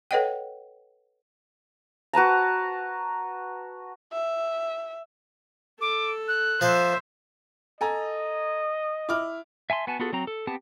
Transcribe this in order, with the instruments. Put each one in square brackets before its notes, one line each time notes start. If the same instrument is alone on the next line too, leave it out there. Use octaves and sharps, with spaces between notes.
[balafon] A4 B4 C#5 D#5 F#5 G5
[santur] F#4 B4 A5 A#5
[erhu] E5
[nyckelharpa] A4 [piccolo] D6
[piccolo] F#6
[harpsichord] F3 F5 [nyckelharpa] C5 E5
[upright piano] A4 G#5 A#5 [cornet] D#5
[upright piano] E4 D6 F6
[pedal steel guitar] E5 G#5 A5 C6
B3 F#4 G#5 A5
B3 F4 F#4 G#4 A4
F#3 C4 A#5
A4
B3 C4 G4 A5